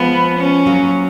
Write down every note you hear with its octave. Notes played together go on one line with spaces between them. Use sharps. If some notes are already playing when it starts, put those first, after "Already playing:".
Already playing: F3 G#3 B3
C#4
F#3 A#3